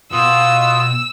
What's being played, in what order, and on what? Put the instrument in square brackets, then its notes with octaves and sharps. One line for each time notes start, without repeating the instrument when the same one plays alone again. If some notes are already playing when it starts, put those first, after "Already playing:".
[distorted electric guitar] B2 [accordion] F4 D#6 [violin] E6